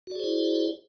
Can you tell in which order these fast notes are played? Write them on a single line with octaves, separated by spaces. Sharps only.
F#4 D5 G#4 C5 E4